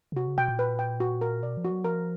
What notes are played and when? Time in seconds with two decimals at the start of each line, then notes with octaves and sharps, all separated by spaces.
0.12 C#3
0.17 C3 F#4
0.27 C#3
0.38 B2 G5
0.48 A#2
0.59 B4
0.79 G5
1.00 F#4
1.21 A#4
1.42 B2 D5
1.57 F3
1.65 F#4
1.71 F#3
1.84 F3 A#4